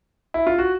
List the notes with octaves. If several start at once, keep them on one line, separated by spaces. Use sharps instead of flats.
E4
F4
F#4